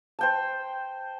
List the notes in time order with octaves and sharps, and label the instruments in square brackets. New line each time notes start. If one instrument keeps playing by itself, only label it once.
[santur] C5 G5 A5